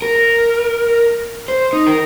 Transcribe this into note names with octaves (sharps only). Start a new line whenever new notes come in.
A#4
C5
D#4
A#4